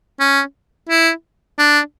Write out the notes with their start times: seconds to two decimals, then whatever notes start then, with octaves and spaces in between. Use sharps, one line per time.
0.20 C#4
0.89 E4
1.59 D4